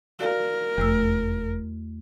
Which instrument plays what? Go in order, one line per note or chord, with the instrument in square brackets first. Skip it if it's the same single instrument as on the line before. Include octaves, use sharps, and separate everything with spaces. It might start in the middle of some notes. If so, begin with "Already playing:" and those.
[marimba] F#4 D5 F5 [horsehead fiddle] A#4
[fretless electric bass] F1 [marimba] E2 A3 E6